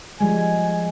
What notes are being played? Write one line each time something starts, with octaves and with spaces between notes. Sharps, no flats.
F3 G3 G#3 G#5